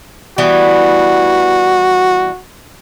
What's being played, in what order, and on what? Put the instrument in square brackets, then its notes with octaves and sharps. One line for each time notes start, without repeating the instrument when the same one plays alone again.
[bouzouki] E3 G3 B3 [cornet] F#4